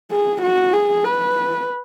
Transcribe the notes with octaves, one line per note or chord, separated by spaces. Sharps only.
G#4
F#4
G#4
B4